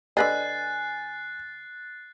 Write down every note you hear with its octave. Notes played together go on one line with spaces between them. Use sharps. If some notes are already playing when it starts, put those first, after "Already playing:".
D3 B4 D#5 G#5 F#6 A6 C7